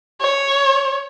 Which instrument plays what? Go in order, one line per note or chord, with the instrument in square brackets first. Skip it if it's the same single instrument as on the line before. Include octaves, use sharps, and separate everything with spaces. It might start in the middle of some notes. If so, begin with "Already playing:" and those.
[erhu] C#5